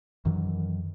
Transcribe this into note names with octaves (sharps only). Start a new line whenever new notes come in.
F#2 D#3 E3 F#3